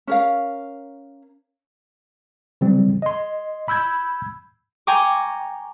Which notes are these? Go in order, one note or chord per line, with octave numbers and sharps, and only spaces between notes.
C#4 A#4 F5
C#3 E3 F#3 G3 C4
D#5 C6
B5 E6 G6 G#6
G5 G#5 A#5 C#6 D6